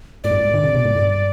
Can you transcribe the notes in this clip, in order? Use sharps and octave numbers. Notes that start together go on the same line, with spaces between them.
G#2 D5
G2
G#2
D3
C3
B2
G#2
G2